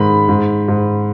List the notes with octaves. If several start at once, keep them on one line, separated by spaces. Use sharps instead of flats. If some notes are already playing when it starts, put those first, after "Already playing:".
Already playing: G#2 D#3 B5
G#2
G#2